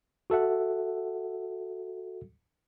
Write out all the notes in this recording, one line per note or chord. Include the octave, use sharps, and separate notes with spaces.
F#4 A4 E5 F#5